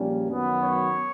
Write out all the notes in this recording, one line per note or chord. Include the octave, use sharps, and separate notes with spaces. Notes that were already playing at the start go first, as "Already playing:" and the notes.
Already playing: A#1 A#2 G3 A#3 C#4
F#2 D#3 F#3 B3
C#5